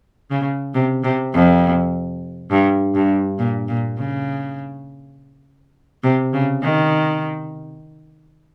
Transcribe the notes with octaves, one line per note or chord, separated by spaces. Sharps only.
C#3
C3
C3
F2
G2
G2
A#2
A#2
C#3
C3
C#3
D#3